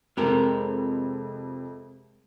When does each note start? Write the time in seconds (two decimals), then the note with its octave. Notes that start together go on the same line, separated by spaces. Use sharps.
0.17 F2 C3 G#3 G4 A#4